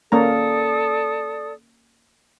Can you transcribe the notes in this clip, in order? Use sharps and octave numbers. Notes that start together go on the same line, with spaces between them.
A#3 C#4 A4 D5 A#5 D#6